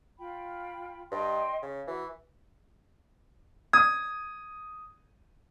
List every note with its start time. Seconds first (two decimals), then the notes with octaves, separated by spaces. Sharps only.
0.18 F4 G5 B5
1.12 G2 D#5 G5 C6
1.62 C#3
1.87 E3 F#4
3.73 D#6 G#6